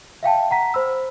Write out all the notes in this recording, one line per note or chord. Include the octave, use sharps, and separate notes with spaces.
E5 F5 G5 A5
F#5 A#5 B6
C5 B5 E6